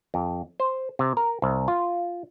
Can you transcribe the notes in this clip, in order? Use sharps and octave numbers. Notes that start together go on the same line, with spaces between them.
F2
C5
C3
A#4
C2
F4